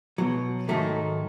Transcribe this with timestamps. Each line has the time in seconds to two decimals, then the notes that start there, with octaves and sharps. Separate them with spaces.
0.18 B2 F#3
0.69 G#2 D#3 F#3 A3